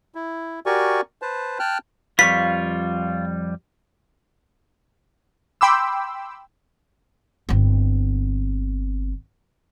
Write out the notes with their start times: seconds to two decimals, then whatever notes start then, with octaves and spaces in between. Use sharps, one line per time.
0.15 E4
0.66 F#4 G4 A#4 D5 G#5 C#6
1.22 B4 C5 A5
1.59 G5 A5 F6 F#6
2.19 F2 G3 F4 B4 F5 C#6 B6
5.61 G5 B5 C6 D6 E6
7.49 G1 C4